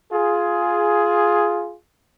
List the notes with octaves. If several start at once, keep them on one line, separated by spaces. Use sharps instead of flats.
F4 G#4